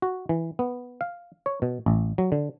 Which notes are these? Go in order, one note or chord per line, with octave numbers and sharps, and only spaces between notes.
F#4
E3
B3
F5
C#5
B2
A1
F#3
D3